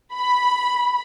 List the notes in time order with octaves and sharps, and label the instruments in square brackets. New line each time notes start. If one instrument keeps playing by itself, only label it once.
[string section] B5